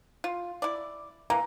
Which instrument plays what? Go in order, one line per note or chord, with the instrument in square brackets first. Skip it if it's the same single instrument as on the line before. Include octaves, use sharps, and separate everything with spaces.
[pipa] F4
E4 D5
[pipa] E3 A#3 [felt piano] A#5